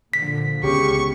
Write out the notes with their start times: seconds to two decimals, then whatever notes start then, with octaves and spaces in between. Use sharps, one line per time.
0.13 A#2 D3 F3 B6
0.63 C#2 C#3 B3 C#4 G4 C#6